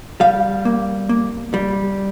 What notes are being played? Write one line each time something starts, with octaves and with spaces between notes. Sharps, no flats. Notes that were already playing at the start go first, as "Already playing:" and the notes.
G3 F5
A#3
A#3
G3